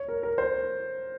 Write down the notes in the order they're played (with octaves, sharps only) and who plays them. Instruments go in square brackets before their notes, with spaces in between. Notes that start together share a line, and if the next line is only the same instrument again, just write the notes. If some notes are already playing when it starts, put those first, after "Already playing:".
Already playing: [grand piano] C#5
A#4
A#4
C5